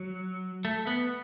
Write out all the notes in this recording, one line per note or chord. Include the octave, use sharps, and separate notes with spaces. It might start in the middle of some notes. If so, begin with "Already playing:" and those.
Already playing: F#3
A3
B3